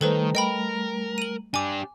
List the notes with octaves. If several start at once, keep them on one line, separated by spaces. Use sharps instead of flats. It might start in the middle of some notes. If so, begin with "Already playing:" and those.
D#3 G3 A3 A4 B4 C5 A#5
A#4 D#5 G5 B5
D#7 F#7
D4 G4 G#5 D6